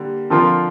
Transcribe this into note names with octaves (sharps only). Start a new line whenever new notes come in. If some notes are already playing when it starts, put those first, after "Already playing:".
Already playing: D3 G3 A#3
D3 F3 C4 F4 A#4